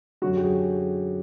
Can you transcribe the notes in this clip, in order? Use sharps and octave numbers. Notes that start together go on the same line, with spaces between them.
F#2 D3 F#3 F#4
G4
G#4